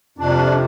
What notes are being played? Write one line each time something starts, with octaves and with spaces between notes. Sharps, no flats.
F2 C3 D4